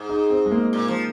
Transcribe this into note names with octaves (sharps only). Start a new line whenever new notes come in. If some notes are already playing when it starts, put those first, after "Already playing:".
Already playing: G#2
D#4
C4
G#3
A#3
A#2
F3